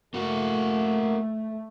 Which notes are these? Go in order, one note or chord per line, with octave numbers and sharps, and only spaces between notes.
A3 A#3 F#4